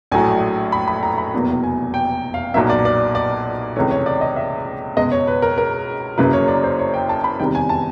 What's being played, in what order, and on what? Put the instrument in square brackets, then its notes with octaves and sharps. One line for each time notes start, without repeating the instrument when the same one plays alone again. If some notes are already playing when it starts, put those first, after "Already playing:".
[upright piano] A#1 A2 F#3 A3 G#5
B5
B5
A#5
B5
F1 E2 B2 F#3 A#3
G#5
G5
F5
B1 A#2 F#3 A#3 E5
D5
D5
D5
C#2 C3 E3 A3 C#5
C#5
D5
D#5
E5
C#2 B2 G#3 D#5
C#5
B4
A#4
A#4
F#1 F#2 C#3 F#3 A#3 B4
C#5
D5
C5
C#5
G5
A5
B5
E2 C3 D#3 G3 G5
G#5
A5